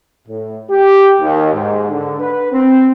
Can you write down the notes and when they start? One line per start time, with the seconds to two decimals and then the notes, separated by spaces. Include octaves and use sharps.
0.28 A2
0.70 G4
1.21 D#2
1.53 G#2
1.90 D3
2.19 B4
2.52 C4